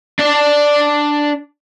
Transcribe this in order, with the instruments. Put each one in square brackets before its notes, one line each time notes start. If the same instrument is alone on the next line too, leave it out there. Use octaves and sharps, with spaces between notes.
[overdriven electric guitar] D4 D5